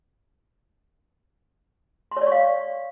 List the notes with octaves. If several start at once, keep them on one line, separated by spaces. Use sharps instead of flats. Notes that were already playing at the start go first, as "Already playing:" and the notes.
C6
C#5
D5
C#6
F5